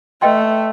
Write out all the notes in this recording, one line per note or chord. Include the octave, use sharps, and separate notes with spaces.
A3 B4 D#5 G5 C6